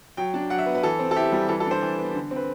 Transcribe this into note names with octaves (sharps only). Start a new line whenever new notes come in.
F#3 G5
D4
F#3 F#5
E5
B3
B4
E3 A4
C4
A4
E4 G4
G3
E3 A4
A4
D4
C5
E3
B3
D3
C4 B4